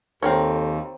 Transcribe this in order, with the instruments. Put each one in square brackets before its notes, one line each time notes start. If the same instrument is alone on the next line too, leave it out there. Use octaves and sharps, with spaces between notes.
[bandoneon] D#2 [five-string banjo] C4 A#4 C#5 [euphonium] A4